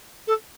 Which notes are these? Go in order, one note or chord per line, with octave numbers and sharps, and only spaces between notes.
A4